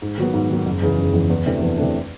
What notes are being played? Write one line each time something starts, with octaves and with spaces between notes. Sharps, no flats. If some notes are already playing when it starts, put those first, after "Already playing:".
G#2
D#3 F#3 B3
G#2
D#3 F#3 B3
F#1
E2 C#3 E3
F#1
E2 C#3 E3
E2
C3 E3 A3 D4
E2
C3 E3 A3 D4